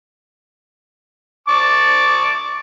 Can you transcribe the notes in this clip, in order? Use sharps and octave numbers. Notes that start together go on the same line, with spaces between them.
A5 C#6 D6